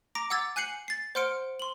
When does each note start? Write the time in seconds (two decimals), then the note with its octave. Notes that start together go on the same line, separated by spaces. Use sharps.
0.15 A#5 D6 A#6 D7
0.30 F#5 D6 E6 G#6 A6
0.56 G#5 F#6 G6 C7 C#7 F#7
0.88 A6 C7
1.15 C5 F#5 C6 F6 C#7 D7
1.60 C6 F#7